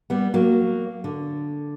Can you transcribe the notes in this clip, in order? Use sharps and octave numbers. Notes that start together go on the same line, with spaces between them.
G3 B3
F#3 A#3
D3